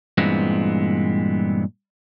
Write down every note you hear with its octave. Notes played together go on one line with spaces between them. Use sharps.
G2 A#2 E3 G#3 B3 C4